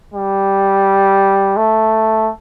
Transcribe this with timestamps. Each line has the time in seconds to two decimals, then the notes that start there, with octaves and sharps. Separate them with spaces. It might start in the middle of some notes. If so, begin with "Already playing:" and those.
0.14 G3
1.57 A3